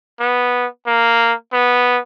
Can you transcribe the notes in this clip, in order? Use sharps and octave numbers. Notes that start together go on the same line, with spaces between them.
B3
A#3
B3